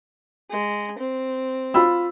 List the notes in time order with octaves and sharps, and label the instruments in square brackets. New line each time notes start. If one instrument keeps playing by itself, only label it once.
[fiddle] G#3
C4
[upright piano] F4 B5 E6